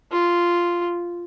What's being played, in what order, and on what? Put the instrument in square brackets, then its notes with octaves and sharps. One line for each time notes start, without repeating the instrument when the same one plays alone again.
[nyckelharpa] F4